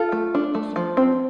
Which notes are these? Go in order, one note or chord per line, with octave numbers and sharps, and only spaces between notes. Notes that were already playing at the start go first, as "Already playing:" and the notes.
Already playing: F4 A4
A3
D4
A3
F3
C4